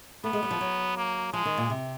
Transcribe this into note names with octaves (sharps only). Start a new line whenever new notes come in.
A3 B3
G#3
G3
F3
F#3
A#3
F3 G#3
D#3
A#2
C3